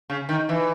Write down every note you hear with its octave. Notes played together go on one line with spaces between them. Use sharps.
C#3
D#3
E3